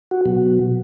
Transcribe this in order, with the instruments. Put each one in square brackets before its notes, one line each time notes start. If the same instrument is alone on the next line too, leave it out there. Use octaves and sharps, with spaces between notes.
[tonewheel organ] F#4
B2 F#3